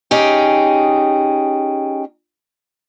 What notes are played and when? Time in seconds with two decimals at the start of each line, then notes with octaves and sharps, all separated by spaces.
0.11 C#4 D#4 G4 G#4